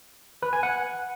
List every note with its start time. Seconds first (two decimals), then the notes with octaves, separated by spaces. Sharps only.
0.43 B4
0.53 G#5
0.63 F#5